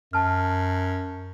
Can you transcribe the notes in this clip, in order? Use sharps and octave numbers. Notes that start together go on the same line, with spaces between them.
F#2 A5 F6